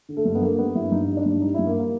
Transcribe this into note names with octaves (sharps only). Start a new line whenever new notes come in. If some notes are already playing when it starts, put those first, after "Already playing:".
D3
A3
G2
B3
G2 A#3
G3 B3
G2 E4
G2 D#4
G3
D4
G2
G3 D#4
G2 E4
A#3
A#3